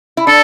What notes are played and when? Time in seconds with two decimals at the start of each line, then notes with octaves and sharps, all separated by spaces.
0.17 E4
0.27 D4 A4